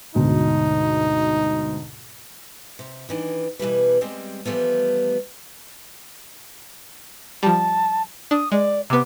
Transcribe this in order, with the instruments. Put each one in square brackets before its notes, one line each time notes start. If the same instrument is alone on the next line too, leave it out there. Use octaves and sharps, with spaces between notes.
[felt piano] D2 G#2 B2 [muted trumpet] D#4
[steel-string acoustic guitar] C3
D#3 E3 D4
B2 E3 G3 B4
G3 G#3 C4
E3 F3 G3 A3 B3
[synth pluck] F3 G3 [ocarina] A5
[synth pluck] D4 [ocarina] D#6
[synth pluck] G#3 [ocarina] D5
[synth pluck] C3 B3 [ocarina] D6